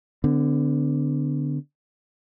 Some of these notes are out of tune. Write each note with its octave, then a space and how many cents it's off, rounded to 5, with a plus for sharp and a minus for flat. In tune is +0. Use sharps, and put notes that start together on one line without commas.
D3 +0 B3 +40